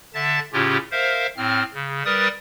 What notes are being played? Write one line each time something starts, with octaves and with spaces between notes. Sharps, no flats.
D3 E5 A5 A6
A2 C#3 C#4 E4 F4 G4
A#4 C5 E5 F5
A2 C4 F6
C#3
G3 A#4 B4 D#6 A6